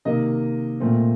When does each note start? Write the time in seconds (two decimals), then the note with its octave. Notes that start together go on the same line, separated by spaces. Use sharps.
0.05 C3 D#3 A#3 D#5
0.80 A#2 A3 C4